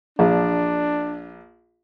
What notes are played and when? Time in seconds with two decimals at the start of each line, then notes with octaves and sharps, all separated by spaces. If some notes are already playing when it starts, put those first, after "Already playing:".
0.19 A#1 D4